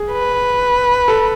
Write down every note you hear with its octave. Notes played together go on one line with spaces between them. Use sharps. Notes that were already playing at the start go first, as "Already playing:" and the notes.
Already playing: G#4
B4
A4